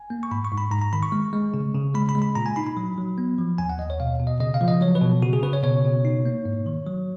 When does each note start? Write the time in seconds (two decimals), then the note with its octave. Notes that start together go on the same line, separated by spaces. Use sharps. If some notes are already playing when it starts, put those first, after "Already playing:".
Already playing: G#5
0.10 A#3
0.23 C#6
0.31 G#2 B5
0.45 C#6
0.52 G#2
0.58 B5
0.71 G#2 A#5
0.82 A#5
0.93 D#3 B5
1.03 C#6
1.12 G#3
1.33 G#3
1.54 C#3
1.75 C#3
1.95 G#3 B5
2.09 B5
2.15 G#3
2.22 B5
2.35 A#2 A#5
2.46 G#5
2.56 D#4 B5
2.67 B5
2.77 F#3
2.98 F#3
3.18 B3
3.38 F3
3.58 D#2 G#5
3.70 F#5
3.79 D#2 D#5
3.90 C#5
4.00 B2 F5
4.20 B2
4.27 D#5
4.40 C#3 D#5
4.54 F5
4.61 F3
4.68 D#5
4.81 F#3 C#5
4.95 B4
5.02 B2
5.22 C#3 F#4
5.33 G#4
5.43 C#3 B4
5.53 C#5
5.63 B2 C#5
5.84 B2
6.05 D#4
6.25 A#3
6.45 G#2
6.66 D#3
6.87 F#3